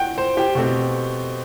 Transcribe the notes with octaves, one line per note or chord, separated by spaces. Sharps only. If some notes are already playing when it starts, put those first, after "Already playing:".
Already playing: F#5 G5
C5
G4
B2 A3 C4